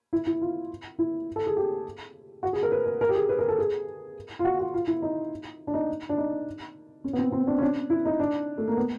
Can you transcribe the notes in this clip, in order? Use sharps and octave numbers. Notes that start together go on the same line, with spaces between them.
E4
E4
F4
E4
A4
G#4
G4
F#4
G#4
A#4
B4
A#4
A#4
G4
G#4
B4
A#4
A4
G#4
F4
F#4
F#4
F4
E4
D#4
D4
D#4
D4
D#4
C#4
B3
C4
C4
D4
C#4
D4
E4
D#4
D4
A3
A#3
B3